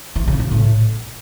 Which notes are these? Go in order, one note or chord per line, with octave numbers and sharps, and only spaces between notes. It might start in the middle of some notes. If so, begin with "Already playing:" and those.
E3
C#3
C#3
A2